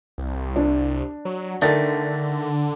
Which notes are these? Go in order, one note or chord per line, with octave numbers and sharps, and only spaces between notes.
C2
D4
F#3
D3 D#3 A3 D5 A6